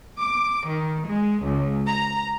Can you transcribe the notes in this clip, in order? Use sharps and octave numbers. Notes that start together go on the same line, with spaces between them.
D6
D#3
G#3
C#2
A#5